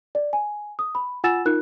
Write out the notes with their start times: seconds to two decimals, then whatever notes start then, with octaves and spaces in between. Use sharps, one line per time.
0.15 D5
0.33 G#5
0.79 D#6
0.95 B5
1.24 F4 F#5 G#5 E6 A6 E7
1.45 D#4 F4 A#4 F#6